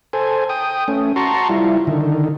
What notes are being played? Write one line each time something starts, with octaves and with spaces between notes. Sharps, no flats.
A4 C5 G#5
G5 D#6
A3 C#4
F#4 A5 A#5 C6 C#6
G3 E4 F4
D3 D#3